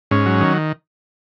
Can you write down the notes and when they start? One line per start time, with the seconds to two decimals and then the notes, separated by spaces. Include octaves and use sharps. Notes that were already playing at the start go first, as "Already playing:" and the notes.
0.11 G#2 C#4
0.26 F#3
0.40 D#3